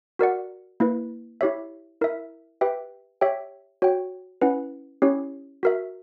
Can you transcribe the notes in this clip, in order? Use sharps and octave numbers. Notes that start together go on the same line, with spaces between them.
F#4 A#4 D5 F#5
A#3 E4 B4
E4 G4 C#5 E5
E4 A#4 E5
G4 B4 E5 G5
G4 C#5 E5 G5
F#4 C#5 G5
C#4 E4 B4 F#5
C#4 E4 G4 C#5
F#4 A#4 E5